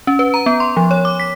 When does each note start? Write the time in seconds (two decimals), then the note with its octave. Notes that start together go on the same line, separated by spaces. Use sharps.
0.07 C#4
0.19 B4
0.34 A#5
0.46 B3
0.60 C6
0.77 F3
0.91 C#5
1.05 D6
1.20 B6